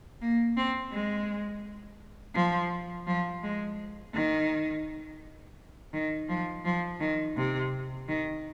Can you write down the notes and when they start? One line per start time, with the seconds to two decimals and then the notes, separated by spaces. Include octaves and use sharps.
0.21 A#3
0.57 C4
0.92 G#3
2.35 F3
3.07 F3
3.43 G#3
4.14 D#3
5.93 D#3
6.29 F3
6.65 F3
7.00 D#3
7.37 C3
8.08 D#3